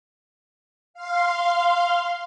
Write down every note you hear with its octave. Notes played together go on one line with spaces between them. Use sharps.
F5 C6